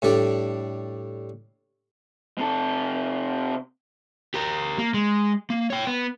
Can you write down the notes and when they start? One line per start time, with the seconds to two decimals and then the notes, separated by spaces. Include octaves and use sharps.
0.02 A2 G3 D4 A4
2.38 C3 A4
4.34 G4 A#4
4.79 A#3
4.94 G#3
5.50 A#3
5.70 C#5 G5
5.87 B3